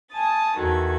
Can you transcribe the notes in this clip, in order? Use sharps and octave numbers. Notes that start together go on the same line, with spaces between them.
G#5 A5 D#6 A6
E2 D#3 F#4 A4 G#6